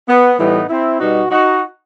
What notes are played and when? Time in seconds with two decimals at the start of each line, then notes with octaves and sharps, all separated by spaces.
0.09 B3
0.39 A2 E3 G3 B3 D#4
0.70 C4 E4
1.00 B2 G3 D#4 F#4
1.31 D#4 F#4